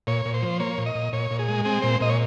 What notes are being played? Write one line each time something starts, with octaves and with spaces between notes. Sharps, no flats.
A#2 C#5
A#2
C5
F3
A#3 C#5
A#2
D#5
A#2
A#2 C#5
A#2
G#4
G#3
C4 G#4
A#2 C5
A#2 D#5
C#5